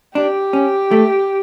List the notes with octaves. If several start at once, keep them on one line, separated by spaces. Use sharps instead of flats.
D4 G4
C#4
A3